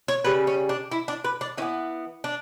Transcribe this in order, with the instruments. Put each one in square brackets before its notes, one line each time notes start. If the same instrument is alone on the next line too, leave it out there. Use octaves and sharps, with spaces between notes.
[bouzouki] C#5
C#3 G3 C#4 B4
C#4
D4
E4
D4
B4
D4
E3 C#4
B3
D4